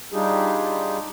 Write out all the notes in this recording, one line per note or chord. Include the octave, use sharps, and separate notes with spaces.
G3 D4 D#4 F4 G4 G#4